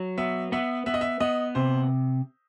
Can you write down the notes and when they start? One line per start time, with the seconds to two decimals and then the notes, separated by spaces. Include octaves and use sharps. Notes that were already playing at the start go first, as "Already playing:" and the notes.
Already playing: F#3
0.18 B3 E5
0.52 B3 E5
0.86 B3 E5
0.94 D#5
1.01 E5
1.20 B3 D#5
1.55 C3 C5